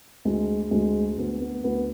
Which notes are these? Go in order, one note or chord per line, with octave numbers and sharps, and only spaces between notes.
D2 G#3
D2 G#3
D2 B3
B3
D2 B3